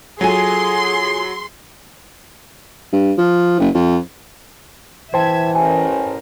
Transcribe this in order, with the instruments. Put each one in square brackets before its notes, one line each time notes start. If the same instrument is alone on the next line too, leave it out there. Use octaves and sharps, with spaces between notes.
[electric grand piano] F#3 [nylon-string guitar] F4 A4 G#5 [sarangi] G#4 [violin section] C6
[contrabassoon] G2
F3
F#1
F2
[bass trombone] E3 [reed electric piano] C5 G5 A5 [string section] E5 G#6
[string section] A1 A#4 [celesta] G#5